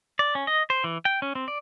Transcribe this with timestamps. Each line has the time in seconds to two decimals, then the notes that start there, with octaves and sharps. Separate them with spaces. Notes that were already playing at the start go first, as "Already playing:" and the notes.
0.19 D5
0.35 C#4
0.47 D#5
0.70 C5
0.84 E3
1.05 G5
1.22 C#4
1.35 C4
1.48 D5